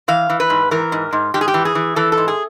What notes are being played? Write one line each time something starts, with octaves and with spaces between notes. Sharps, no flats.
E3 F5
E3
B4
G#2
E3 A#4
G#2
G#2
G#2 G4
G#4
G4
E3
G#4
E3
E3 A4
A4
G#2
G#4